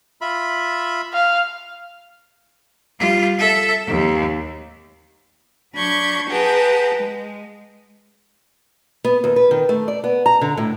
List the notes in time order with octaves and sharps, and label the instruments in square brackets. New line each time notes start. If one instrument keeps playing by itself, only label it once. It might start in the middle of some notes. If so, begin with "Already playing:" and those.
[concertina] F4 E5 B5
[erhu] F5
[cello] G3 F4
A4 E5
D#2
[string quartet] F#3 D4 B5 C#6 G6 G#6
G#4 B4 F#5 G5 A5 A#5
G#3
[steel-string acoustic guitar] B3
D#2
B4
D#3
A3
D5
B3
A#5
D3
A2